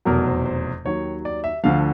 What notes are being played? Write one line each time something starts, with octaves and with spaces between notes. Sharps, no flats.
F1 E2 B2 F#3 A#4
C5
C5
D#2 D#3 F#3 C#5
D5
E5
D2 D3 F3 F5